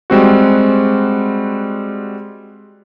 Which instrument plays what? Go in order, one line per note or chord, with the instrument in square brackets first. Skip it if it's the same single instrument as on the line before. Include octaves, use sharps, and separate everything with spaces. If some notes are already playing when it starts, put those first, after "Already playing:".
[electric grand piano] G3 G#3 C4 F#4